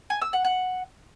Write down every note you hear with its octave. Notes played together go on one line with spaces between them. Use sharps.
G#5
E6
F#5
F#5